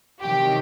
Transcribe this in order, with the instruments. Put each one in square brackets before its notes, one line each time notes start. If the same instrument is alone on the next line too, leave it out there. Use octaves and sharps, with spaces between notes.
[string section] C3 D#3 F#3 G4